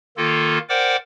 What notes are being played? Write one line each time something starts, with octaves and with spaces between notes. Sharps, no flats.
D#3 A#3 F4 A4
A#4 C5 D5 F#5 G5 D6